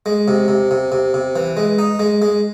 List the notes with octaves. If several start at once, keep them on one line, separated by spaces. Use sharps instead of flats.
G#3
C3
C3
C3
C3
C3
E3
G#3
D#4
G#3
G#3